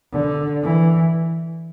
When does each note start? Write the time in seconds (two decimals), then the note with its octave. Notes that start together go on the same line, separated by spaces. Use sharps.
0.12 D3
0.63 E3